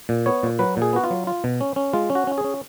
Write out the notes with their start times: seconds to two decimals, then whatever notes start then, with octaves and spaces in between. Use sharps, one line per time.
0.09 A#2
0.26 B3 C#5
0.43 A#2
0.59 F#3 B4
0.77 A#2 G#4
0.93 B3 F#4
1.04 F4
1.10 F#3
1.27 F4
1.44 B2
1.61 C#4
1.76 C#4
1.93 G#3 F4
2.10 C#4
2.15 F#4
2.27 C#4
2.38 G#4
2.44 C#4